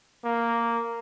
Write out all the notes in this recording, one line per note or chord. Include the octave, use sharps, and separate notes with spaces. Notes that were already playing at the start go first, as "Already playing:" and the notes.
A#3